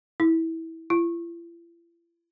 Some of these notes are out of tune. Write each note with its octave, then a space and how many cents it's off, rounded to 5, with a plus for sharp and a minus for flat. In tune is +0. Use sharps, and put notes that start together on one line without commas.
E4 -20
E4 +45